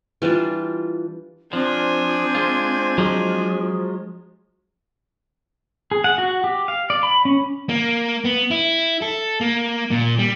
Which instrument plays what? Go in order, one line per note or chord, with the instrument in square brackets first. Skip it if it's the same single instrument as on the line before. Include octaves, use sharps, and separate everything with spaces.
[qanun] E3 G3 D4 F4
[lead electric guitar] F3 [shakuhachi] C4 [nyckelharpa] D4 G#5
[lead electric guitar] G#3 F4
[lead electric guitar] F3 [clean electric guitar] F#3 G#3
[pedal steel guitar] G#4
F#5
F#4
G4
F5
D5
B5
C#4
[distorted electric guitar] A#3
B3
E4
A4
A#3
A#2
G3